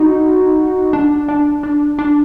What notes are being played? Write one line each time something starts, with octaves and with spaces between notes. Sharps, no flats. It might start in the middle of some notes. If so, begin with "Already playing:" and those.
Already playing: D#4 F#4
D4
D4
D4
D4